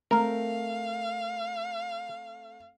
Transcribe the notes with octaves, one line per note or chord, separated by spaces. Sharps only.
A3 C4 A#4 F5